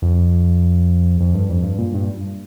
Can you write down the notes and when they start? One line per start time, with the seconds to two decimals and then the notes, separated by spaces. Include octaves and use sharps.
0.02 F2
1.20 F2
1.34 G2
1.49 F2
1.64 G2
1.78 A#2
1.94 G2